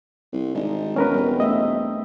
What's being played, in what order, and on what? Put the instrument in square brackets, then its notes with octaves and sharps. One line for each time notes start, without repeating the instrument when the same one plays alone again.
[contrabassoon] C2
[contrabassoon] G#1 [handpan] D4 D#4
[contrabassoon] E1 [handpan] B3 [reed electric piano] C#4 A#4 B4
[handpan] G3 C4
[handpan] A3 E5 [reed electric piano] D#5